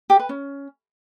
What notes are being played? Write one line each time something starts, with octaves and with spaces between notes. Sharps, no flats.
G4
B4
C#4